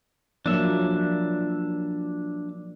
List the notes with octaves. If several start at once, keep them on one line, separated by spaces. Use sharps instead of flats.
F3 F#3 A#3 D4 E5